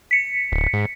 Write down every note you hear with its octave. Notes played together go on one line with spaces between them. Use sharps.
B6 C#7
D1
G#2